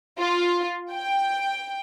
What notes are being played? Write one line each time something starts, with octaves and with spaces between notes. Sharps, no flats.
F4
G5